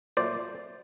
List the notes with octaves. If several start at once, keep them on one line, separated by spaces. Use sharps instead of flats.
A#2 F#3 A3 C5 D5